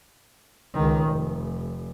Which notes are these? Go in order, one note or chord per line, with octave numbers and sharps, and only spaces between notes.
C#2 D#3
F1